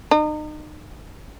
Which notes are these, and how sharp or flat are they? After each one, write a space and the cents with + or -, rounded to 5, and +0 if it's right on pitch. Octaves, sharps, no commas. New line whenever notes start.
D#4 -35